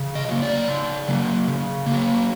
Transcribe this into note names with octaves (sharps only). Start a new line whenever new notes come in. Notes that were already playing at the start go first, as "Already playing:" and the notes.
Already playing: C#3
D#5
F#3 A#3
D5
C#3
F#3 A#3
C#3
A#3
F#3